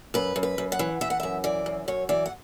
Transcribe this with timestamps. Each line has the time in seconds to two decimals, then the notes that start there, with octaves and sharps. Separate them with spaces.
0.14 F#2 B4
0.36 F#2
0.43 B4
0.58 F#2
0.72 F#5
0.79 E3
1.01 E3 E5
1.10 F#5
1.20 F#2 E5
1.44 E3 D5
1.66 F#2
1.88 F#2 C#5
2.09 E3 D5
2.26 F#5